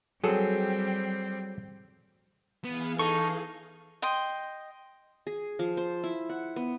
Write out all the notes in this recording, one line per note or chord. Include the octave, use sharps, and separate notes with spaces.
F#3 G3 C4 G#4 A4
E3 B3 G#4 F5
D#4 A4 C#6
D#5 G5 C6
G#4
F3
C5
E4
F#5
B3